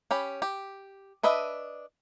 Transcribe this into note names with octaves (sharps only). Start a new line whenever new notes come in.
C#4 G4 B5
G4
D4 B4 D#5 E5